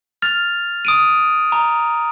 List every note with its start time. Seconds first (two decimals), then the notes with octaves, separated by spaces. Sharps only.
0.22 F6 A6 F7
0.85 D#6 D7 D#7
1.52 A#5